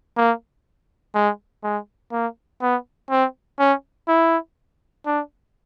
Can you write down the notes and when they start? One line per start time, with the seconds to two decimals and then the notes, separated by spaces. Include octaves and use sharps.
0.17 A#3
1.15 G#3
1.63 G#3
2.12 A#3
2.62 B3
3.10 C4
3.59 C#4
4.08 E4
5.06 D4